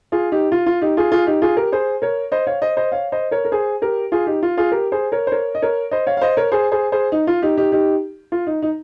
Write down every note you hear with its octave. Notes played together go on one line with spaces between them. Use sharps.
F4 G#4
D#4 G4
F4
F4
D#4 G4
F4 G#4
F4 G#4
D#4 G4
F4 G#4
G4 A#4
G#4 C5
A#4 C#5
C5 D#5
C#5 F5
C5 D#5
C5 D#5
C#5 F5
C5 D#5
A#4 C#5
A#4
G#4 C5
G4 A#4
F4 G#4
D#4 G4
F4
F4 G#4
G4 A#4
G#4 C5
A#4 C#5
C5
A#4 C#5
D#5
A#4 C#5
C5 D#5
C#5 F5
F5
C5 D#5
A#4 C#5
G#4 C5
G#4 C5
G#4 C5
D#4
F4
D#4 G4
D#4 G4
D#4 G4
F4
D#4
D#4